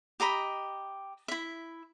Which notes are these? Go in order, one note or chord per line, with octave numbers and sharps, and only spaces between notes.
G4 D#5 A#5 B5
E4 E5